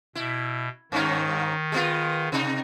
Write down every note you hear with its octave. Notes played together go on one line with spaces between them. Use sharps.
B2 E4
G2 D#3 C#4 D#4
G#3 B3 F4
C3 D#4